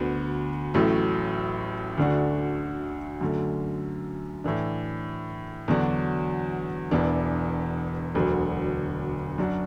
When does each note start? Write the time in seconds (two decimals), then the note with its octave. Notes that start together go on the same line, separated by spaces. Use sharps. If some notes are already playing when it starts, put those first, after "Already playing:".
Already playing: D2 D3 B3 F#4
0.74 A1 A2 F#3 A3
1.98 D2 D3 A3 D4 F#4
3.21 F#2 D3 A3
4.44 A2 E3 D4
5.68 E2 D3 F#3 D4 F#4
6.91 E1 E2 E3 D4
8.15 E1 D2 D3 F#3
9.38 F#2 F#3 D4 F#4